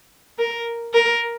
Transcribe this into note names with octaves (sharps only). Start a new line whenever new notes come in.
A#4
A#4